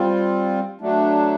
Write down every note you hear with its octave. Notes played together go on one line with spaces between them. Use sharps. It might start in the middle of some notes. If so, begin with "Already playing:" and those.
Already playing: G3 C4 F4
F#3 A3 D4